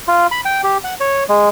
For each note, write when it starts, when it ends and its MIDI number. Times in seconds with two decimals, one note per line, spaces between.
0.08 0.27 65
0.31 0.41 83
0.45 0.61 79
0.64 0.78 67
0.84 0.94 78
1.00 1.24 73
1.29 1.49 56